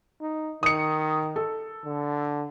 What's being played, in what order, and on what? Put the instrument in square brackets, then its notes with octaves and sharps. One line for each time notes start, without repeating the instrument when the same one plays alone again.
[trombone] D#4
[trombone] D#3 [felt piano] D#6 C#7
[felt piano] A4
[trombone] D3